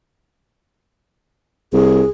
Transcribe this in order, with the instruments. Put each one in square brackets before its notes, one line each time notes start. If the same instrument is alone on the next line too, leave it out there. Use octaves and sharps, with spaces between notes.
[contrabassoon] C2 [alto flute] G#4